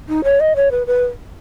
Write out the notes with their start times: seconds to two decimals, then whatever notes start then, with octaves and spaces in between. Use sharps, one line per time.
0.09 D#4
0.24 C#5
0.40 D#5
0.56 C#5
0.71 B4
0.87 B4